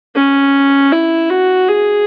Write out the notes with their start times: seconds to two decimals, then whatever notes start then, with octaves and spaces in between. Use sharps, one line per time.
0.15 C#4
0.92 E4
1.30 F#4
1.68 G#4